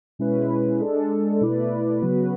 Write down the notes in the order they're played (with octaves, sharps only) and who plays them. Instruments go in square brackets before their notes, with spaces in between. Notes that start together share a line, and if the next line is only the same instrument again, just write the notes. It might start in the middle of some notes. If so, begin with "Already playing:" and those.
[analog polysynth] B2 G#3 C#4 E4 B4
G#3 D4 A4
B2 A3 E4 B4 D5
C#3 F#3 B3 F#4 B4